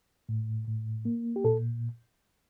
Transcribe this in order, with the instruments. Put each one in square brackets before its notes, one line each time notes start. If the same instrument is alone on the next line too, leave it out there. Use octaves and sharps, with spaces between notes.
[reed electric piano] A2
A2
A#3
G4
A#2 A4